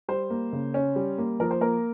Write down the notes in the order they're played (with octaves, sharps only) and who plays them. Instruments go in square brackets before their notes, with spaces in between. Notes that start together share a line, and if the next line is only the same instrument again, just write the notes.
[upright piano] G3 C5
A#3
C#3
C#4
G3
A#3
F3 A#4
C5
A#3 A#4